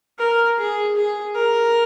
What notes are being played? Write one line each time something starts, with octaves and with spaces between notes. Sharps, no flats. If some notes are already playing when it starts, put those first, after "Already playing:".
A#4
G#4
G#4
A#4